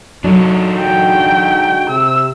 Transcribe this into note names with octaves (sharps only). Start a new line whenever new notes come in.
F#3 D4 D#4 A4
D3 G#3 F#4 G5
C3 E6